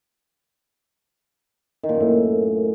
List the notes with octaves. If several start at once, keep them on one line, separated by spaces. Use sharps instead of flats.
D#3
A#2
F#2
A2